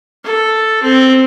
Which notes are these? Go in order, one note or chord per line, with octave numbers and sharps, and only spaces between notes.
A4
C4